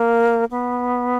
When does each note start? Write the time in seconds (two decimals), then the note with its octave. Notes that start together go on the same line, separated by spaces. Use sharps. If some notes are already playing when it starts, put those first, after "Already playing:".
Already playing: A#3
0.51 B3